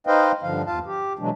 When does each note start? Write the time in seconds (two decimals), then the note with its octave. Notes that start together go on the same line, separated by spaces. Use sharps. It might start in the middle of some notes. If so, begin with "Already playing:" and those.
0.07 D#4 B4 C5 D#5 F5 G5
0.42 G2 D3 F3 F5
0.66 E2 F4 F5 A5
0.86 G4
1.19 B2 E3 F#3 G#3 D4